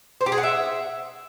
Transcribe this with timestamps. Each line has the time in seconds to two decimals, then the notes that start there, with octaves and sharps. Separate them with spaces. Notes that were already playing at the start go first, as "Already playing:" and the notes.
0.21 C5
0.26 G4
0.32 G#4
0.38 F#5
0.43 E5